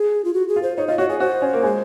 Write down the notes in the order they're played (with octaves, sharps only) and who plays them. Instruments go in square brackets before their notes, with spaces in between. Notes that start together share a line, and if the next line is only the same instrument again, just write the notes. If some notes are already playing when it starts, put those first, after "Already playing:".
Already playing: [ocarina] G#4
F4
F#4
G#4
[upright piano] F4
[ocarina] C5
[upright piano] D#4 [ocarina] C#5
[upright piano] F4 [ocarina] D#5
[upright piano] F#4 [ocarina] C#5
[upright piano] G#4 [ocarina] C#5
[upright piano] F#4 [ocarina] C5
[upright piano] C#4
A#3
G#3